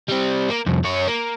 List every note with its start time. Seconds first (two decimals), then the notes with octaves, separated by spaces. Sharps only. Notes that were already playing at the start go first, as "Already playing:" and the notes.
0.08 G3 C4
0.50 A#3
0.67 C2 F2
0.84 F#2 C#5
1.08 A#3